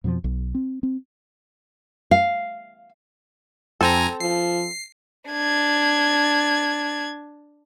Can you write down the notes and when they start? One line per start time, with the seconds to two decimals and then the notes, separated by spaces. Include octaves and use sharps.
0.04 F2 B2 D3 F3
0.24 B1
0.55 C4
0.83 C4
2.11 F5
3.81 F2 C4 A4 G#5 A#5
4.20 F3 C7
5.29 D4 G#6